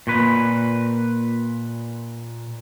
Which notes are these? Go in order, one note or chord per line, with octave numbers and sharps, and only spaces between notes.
A#2 B4